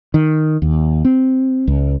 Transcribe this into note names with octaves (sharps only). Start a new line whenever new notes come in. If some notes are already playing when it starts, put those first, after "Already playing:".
D#3
D#2
C4
C#2